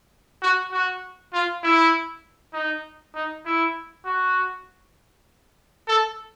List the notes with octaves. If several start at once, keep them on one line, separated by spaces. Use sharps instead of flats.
F#4
F#4
F4
E4
D#4
D#4
E4
F#4
A4